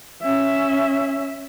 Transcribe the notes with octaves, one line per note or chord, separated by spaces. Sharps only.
C#4 E5